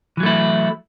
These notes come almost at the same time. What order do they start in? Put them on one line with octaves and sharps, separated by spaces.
E3 F#3 A3 E4